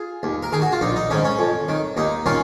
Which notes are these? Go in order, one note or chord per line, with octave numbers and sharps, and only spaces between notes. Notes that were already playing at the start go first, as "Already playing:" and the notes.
Already playing: F4 G#4
D#2
A#4
D#3 G#4
F#4
F4
A#1 D#4
D#4
G#2 D#3 C#4
C#4
F2
D#3
D#2 D#4
D#3 C#4 F4